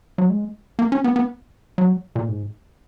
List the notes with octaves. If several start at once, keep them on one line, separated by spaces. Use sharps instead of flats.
F#3
G#3
A#3
C#4
B3
B3
F#3
A#2
G#2